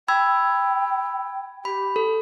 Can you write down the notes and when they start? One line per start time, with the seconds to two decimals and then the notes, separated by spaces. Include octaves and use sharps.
0.08 G5 B5 E6 G#6
1.65 G4 B5
1.96 A4